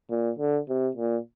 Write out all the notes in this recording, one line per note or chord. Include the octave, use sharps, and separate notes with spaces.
A#2
D3
C3
A#2